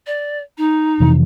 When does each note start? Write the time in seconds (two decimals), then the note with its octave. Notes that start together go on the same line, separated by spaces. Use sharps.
0.06 D5
0.57 D#4
1.00 F2 C3 E3